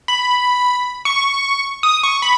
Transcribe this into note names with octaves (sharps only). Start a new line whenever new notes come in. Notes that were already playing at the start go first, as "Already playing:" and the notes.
B5
C#6
D#6
C#6
B5